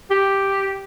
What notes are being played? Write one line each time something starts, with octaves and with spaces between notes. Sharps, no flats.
G4